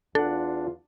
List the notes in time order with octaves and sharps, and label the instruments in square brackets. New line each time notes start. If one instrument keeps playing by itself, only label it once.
[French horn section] E2 F4 [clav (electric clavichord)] D4 F#5 [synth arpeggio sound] A4